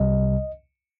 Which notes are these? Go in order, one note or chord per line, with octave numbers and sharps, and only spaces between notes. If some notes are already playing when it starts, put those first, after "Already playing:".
Already playing: C2 C3 G3 D#5